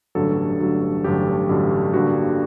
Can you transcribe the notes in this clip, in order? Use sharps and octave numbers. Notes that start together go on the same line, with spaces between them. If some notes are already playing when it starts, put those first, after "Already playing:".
A1 G2 D3 F#3 A4
A1 G2 D3 F#3
A1 G2 D3 F#3 G4
A1 G2 D3 F#3
G2 D3 G3 A#3 F#4